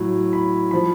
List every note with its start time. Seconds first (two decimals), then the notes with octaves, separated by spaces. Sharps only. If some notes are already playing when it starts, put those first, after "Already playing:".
Already playing: A2 F#3
0.33 B5
0.71 F3 B5